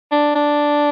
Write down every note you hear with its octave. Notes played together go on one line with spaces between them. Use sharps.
D4
D4